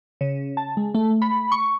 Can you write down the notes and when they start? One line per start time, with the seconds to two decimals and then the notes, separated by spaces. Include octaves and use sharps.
0.21 C#3
0.57 A5
0.77 G#3
0.95 A3
1.22 B5
1.52 C#6